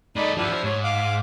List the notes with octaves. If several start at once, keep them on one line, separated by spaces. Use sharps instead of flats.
G#3 D#4 A4 D5 B5
F3 B3 D4 E4 G4
F3 C5
G#2 C#5
F5 D6